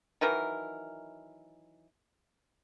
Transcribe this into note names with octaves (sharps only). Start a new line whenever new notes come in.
D#3 E3 F#3 A#4